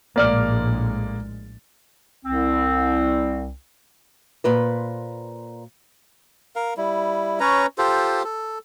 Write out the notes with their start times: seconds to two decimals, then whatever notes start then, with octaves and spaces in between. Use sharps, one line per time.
0.16 A#1 A2 G#3 A#3 D5 F6
2.25 C2 C4
4.44 A#2 B4 C5
6.56 A#4 F5
6.77 G3 E4
7.40 C#4 B4 C#5 A#5
7.78 F4 G4 A4 C5
8.24 A4